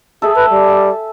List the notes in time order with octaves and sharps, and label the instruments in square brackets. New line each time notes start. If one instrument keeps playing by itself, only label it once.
[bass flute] G#4 [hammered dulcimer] A4 E5 G#5
[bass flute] B4
G3